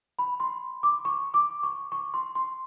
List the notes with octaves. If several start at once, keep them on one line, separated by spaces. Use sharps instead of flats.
B5
C6
D6
C#6
D6
C#6
C#6
C6
C6